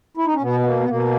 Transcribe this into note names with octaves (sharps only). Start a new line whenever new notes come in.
E4
D#4
C#4
B2 B3
B3
A#3
B3
B2 A#3